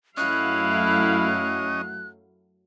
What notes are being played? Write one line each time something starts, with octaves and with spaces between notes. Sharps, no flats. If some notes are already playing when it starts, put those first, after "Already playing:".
F#2 F#3 A3 C#4 E4 D#5 F5 F#6